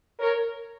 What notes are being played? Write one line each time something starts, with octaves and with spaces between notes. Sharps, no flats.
A#4 C#5